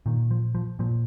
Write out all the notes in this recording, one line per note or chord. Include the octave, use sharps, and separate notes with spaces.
A#2 D#3
F3
F3
A#2 F3